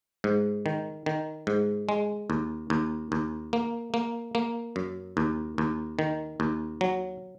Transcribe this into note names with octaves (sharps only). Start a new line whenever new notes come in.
G#2
D#3
D#3
G#2
G#3
D#2
D#2
D#2
A#3
A#3
A#3
F#2
D#2
D#2
D#3
D#2
F#3